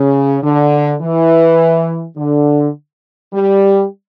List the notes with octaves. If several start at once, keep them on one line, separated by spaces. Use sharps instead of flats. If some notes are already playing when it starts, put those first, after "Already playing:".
Already playing: C#3
D3
E3
D3
G3